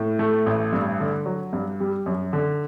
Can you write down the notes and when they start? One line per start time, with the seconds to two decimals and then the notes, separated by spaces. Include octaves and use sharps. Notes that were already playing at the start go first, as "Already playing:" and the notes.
Already playing: A2
0.19 A3
0.46 A1
0.73 G2
1.00 D3
1.26 F#3
1.53 G2
1.80 G3
2.06 F#2
2.33 D3